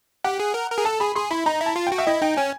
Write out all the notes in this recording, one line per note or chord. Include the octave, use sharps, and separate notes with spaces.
G4 F#5
G#4
A#4
A#4
G#4
A4 A5
G#4 B5
G#4 C6
E4 B5
D#4 A#5
E4
A5
F4
G5
F#4
E5
E4 D#5
D#4 G5
C#4 G#5